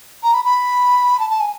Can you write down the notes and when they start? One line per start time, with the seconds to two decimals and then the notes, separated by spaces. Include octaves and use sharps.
0.23 A#5
0.34 B5
0.45 B5
1.20 A5
1.30 A5
1.40 G#5